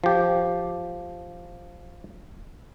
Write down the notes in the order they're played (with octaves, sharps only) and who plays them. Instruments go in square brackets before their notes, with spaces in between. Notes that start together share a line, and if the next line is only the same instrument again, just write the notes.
[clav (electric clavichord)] F3 G4